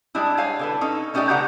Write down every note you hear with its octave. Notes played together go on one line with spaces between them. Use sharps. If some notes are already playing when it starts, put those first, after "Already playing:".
G3 G#3 D4 E4
C#5 F5 G#5
D3 A4 B4
C#4 D#4 A4
A3 C#4 D#4 G4 D5 E5
C#3 A3 G4 B4 F#5 A#5